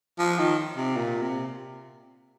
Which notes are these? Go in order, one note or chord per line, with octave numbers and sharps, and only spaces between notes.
F3
D#3
C3
A#2
C3